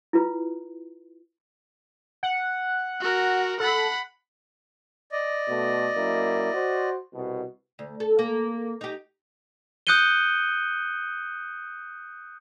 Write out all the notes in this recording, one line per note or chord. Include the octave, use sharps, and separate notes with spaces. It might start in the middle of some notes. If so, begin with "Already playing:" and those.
E4 F4 B4
F#5
F#4 A#4
A4 F#5 B5
D5 D#5
B2 A3
F#2 A#3 E4
F#4 C5
C2 B2
D2
A4
A#3
D#4 G4
D#6 F#6 G6 C#7 D#7 G7